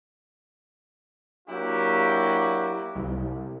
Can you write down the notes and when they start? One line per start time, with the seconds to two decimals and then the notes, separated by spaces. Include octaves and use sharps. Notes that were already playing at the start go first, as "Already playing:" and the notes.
1.49 F#3 A#3 D4 E4 F#4 G4
2.95 C2